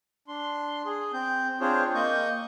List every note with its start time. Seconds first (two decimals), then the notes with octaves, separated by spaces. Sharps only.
0.28 D4 C6
0.85 G#4
1.13 C4 G6
1.60 C4 D4 F4 G#4 C5 C#5
1.95 A#3 D#5 C#6 G6